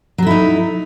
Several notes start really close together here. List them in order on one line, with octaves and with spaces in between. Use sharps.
F#3 A4 E4 D#4